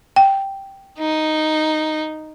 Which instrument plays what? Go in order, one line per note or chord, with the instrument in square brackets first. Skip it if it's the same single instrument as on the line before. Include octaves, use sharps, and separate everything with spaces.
[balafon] G5
[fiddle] D#4